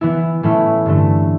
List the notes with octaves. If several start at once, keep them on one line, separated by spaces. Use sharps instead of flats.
E3 B3 E4
A2 E3 A3 C#4 E4
G2 D3 A3